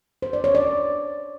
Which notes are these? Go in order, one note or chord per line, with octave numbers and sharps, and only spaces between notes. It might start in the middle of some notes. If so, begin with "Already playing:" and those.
C5
D5
C#5
D5